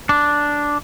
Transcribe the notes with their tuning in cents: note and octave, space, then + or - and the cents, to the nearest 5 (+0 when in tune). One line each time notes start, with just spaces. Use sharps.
D4 -5